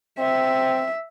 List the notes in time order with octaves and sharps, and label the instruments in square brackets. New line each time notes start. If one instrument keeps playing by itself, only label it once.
[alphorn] C4 [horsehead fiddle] E5